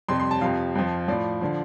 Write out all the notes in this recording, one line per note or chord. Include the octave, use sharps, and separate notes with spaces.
F2 C3 G3 C6
C6
A5
F2 C3 F3 F5
F2 F3
A2 F3 D5
D3 F3